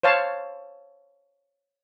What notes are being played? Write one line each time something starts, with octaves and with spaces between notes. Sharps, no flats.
C5 C#5 F5 A5